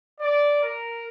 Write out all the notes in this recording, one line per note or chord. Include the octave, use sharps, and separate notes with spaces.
D5
A#4